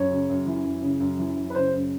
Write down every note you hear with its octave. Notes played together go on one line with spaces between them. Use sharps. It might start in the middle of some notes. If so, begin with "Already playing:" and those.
Already playing: F#2 C#5
C#3
F#2
E3
F#2
C#3
F#2
E3
F#2
B4
C#3 C5
F#2